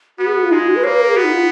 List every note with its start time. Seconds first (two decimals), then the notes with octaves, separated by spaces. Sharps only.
0.18 B3 F#4
0.26 G#4
0.35 F#4
0.43 F4
0.51 G#3 D#4
0.59 F4
0.67 F#4
0.76 B4
0.84 A#3 C#5
0.93 B4
1.00 A#4
1.08 G#4
1.16 B3 F#4
1.24 D#4
1.33 F4